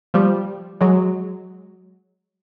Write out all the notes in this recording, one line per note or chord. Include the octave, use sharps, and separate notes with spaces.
F3 G3
F#3 G#3